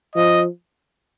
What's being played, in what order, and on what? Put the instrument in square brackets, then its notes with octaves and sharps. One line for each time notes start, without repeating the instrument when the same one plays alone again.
[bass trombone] F3 [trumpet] D#5